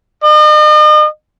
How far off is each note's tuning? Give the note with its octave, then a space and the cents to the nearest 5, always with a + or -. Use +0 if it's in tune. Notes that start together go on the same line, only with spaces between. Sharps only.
D#5 -40